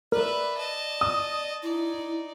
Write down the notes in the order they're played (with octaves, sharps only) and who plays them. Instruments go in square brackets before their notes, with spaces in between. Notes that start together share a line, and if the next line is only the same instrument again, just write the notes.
[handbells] A#4 [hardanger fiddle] B4 E5 [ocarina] D5
[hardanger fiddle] D#5 A5
[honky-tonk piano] D#6
[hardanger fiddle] D#4 D5 [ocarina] E4